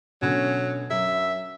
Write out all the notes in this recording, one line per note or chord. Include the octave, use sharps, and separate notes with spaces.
B2 D3 F#3 C#4
F#2 F#3 E5